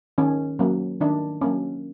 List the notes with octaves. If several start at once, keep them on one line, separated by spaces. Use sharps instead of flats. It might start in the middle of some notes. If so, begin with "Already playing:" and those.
D#3 C#4
F#3 A#3 C#4
D#3 D4
F#3 A#3 C#4